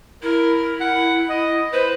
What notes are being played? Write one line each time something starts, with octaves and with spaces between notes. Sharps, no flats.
E4 A#4
F#5
D#5
B4 C5